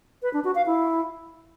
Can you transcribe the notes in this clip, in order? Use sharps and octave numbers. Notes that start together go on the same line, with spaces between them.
B4
D4
F#4
F5
E4